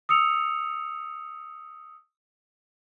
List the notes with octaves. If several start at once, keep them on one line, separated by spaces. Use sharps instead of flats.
D#6 E6 C#7 F7